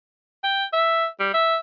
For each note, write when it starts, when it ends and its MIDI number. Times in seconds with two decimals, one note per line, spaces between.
0.44 0.64 79
0.73 1.07 76
1.20 1.29 55
1.34 1.57 76